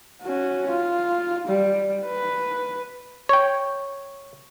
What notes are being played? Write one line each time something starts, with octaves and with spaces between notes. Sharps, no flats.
C#4 F#4
F4
G3
B4
C#5 G5